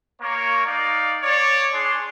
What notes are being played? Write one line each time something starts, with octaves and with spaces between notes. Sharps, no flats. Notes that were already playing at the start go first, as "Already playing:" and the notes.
A#3 C#5
D#4 D5 F5
C#5 D5
D4 G#4 C6